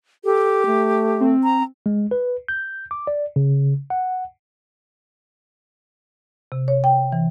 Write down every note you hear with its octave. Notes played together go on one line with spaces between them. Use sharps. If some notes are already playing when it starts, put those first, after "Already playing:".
G4 A4
A3
C4
A#5
G#3
B4
G6
D6
D5
C#3
F#5
C3
C#5
G5
E3